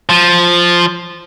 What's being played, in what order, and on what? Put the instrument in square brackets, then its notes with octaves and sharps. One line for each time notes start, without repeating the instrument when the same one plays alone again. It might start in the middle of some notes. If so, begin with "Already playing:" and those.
[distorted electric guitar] F3